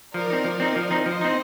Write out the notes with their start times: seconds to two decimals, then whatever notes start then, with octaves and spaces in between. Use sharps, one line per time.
0.14 F3 A#4 D5
0.30 C4 D#4
0.44 F3
0.60 C4 D#4
0.76 F3
0.91 C4 D#4
1.06 F3 C5 D#5
1.21 C4 D#4